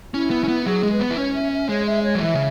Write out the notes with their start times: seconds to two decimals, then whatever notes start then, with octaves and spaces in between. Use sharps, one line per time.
0.14 C#4 E4
0.30 B3
0.44 C#4
0.48 B3
0.66 F#3 G#4
0.83 G#3
0.92 B4
1.00 B3
1.11 E4
1.17 C#4 C#5
1.34 E5
1.52 E5
1.69 G#3 C#5
1.86 E5
2.03 C#5
2.15 F#3
2.21 E3 E5
2.34 C#3